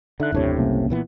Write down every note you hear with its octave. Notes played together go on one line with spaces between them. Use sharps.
D3 D#4 E5 F#6
F#1 D#2 A2 C3 D4 C#5
C2 A#3 C#4
A#2 E3 B3